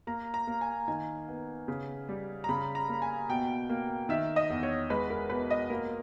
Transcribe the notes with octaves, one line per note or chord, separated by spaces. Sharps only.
A#3 A#5
A#5
A#3
G#5
D#3 G#5
B3
C#3
G3
A#5
C#3 B5
A#5
A#3
G#5
B2 G5
A#3
D#3 E5
D#5
E2
C#5
G#3 B4
A#4
B2 B4
D#5
A#3 A#4